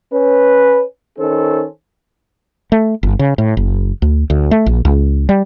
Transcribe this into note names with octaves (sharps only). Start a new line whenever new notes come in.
C#4 B4
D#3 C#4 A4 C5
A3
G1
C#3
A2
F#1
D2
D2
A3
A#1
C#2
G3